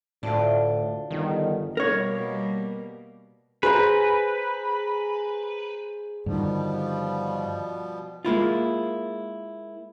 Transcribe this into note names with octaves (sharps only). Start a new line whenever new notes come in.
D2 A2 D4 F4
G1 D#3
B2 G3 A#3 A#4 C#5
G#4 B4 C5 A#5
G2 B2 D3 D#3 F3 G3
G#3 A#3 E4 F4